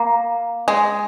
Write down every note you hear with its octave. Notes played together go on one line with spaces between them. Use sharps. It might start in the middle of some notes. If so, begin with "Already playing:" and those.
Already playing: A#3
G#3